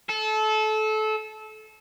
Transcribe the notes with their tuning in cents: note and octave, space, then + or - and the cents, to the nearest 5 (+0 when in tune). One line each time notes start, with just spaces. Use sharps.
A4 -25